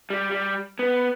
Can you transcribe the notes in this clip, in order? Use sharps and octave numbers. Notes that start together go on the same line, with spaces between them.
G3
G3
B3